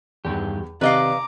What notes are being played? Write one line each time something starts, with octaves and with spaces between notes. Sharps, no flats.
E2 G2 D#3 G4
C3 D#3 B4 D5 D#5 F5 A#5 D6